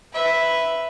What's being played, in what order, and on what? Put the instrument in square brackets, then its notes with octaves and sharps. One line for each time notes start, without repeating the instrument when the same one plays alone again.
[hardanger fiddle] B4 E5